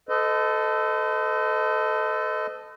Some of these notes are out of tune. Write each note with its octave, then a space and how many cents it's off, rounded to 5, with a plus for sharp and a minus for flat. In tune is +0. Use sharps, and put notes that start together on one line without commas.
A4 +0 C5 -45 D#5 +0